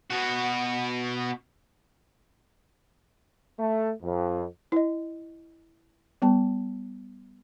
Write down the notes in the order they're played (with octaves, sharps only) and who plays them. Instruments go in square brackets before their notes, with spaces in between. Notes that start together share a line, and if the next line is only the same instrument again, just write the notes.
[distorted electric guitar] B2 F#4
[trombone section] A3
F2
[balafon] E4 D#5
G3 B3 A5